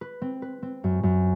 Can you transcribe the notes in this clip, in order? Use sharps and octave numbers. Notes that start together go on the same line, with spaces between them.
B4
C4
B4
C4
F#2
F#2